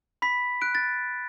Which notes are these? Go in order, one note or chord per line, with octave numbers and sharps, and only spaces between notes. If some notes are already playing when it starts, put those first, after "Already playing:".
B5 B6
F#6 D7
A6